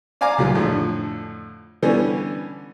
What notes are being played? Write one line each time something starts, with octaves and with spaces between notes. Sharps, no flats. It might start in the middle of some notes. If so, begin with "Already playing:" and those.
D5 F5 G#5 A#5 D6
C#2 A#2 F#3
F2 A2 D3
D3 E3 G3 B3 C#4